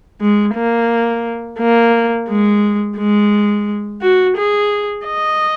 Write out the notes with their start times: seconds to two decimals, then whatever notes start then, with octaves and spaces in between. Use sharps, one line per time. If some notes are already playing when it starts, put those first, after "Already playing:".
0.21 G#3
0.55 A#3
1.59 A#3
2.29 G#3
2.98 G#3
4.02 F#4
4.37 G#4
5.06 D#5